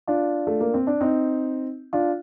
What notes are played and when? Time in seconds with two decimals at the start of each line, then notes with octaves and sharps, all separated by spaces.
0.07 D4 F4
0.47 A3
0.60 A#3
0.74 C4
0.87 D4
1.01 C4 D#4
1.93 D4 F4